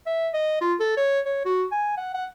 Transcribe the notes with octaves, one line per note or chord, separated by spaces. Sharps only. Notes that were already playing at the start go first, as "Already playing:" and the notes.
E5
D#5
F4
A4
C#5
C#5
F#4
G#5
F#5
F#5